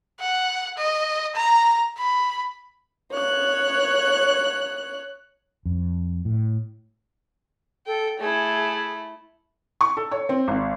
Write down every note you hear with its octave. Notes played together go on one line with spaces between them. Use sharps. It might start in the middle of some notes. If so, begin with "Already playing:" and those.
F#5
D#5
A#5
B5
C#5 F#6
F2
A2
A4 G5
A3 E4 G#4
C#6
A4
C#5
C4
G#1